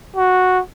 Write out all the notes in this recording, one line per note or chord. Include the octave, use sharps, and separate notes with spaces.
F#4